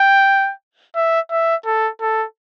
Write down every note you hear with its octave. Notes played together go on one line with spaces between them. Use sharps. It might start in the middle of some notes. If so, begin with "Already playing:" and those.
Already playing: G5
E5
E5
A4
A4